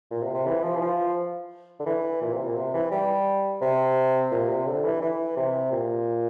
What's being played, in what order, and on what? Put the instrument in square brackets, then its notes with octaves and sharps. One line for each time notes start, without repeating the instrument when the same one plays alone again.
[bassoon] A#2
C3
C3
E3
F3
E3
F3
D3
E3
A#2
C3
A#2
C3
E3
G3
C3
A#2
C3
D3
E3
E3
C3
A#2